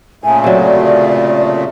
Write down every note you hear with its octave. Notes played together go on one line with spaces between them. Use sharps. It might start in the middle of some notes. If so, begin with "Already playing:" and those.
A#2 C#3 A3 G#5
C3 F#3 D5